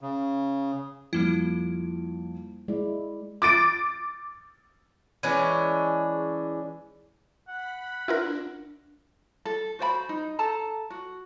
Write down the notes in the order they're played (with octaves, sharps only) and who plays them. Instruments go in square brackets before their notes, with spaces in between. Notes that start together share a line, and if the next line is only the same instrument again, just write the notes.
[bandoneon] C#3
[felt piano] F2 [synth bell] G3 A#3 E4
[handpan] G#3 E4 [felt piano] D5
[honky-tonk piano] D6 A6 D7
[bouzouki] E3 G#3 C#4 D4
[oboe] F#5 [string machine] B5
[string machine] D4 [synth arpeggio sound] E4 F4 A#4
[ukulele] A4
F#4 C5 G5 B5
D#4
A4 A5 A#5
F#4